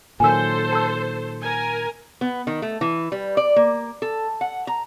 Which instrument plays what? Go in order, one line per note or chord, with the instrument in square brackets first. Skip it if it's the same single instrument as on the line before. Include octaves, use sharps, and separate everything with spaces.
[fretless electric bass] A#2 D#3 F#3 [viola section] A4 C5 [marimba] G#5 E6
[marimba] A5 E6
[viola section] A#4 G#5
[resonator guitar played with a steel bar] B3
D#3
A3
E3
G3
D5
A#3
A4
F#5
A#5